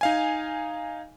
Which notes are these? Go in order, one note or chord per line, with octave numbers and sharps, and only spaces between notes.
D#4 F5 G#5